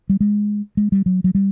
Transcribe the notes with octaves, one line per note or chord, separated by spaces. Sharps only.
G3
G#3
G#3
G3
F#3
F#3
G3